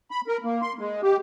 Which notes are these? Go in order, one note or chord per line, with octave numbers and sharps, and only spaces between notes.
B5
A#4
A#3
C6
G#3
G4